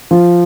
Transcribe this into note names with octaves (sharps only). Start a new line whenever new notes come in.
F3